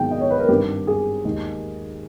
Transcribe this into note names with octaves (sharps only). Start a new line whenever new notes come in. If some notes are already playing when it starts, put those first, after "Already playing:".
Already playing: G#1 G#2 D#3 G#3 B3 G5
D#5
C#5
B4
A#4
G#1 G2 G3 G4
G#4
D#2 D#3 G#3